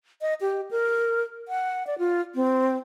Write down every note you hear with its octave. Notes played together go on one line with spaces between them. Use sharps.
D#5
G4
A#4
F#5
D5
F4
C4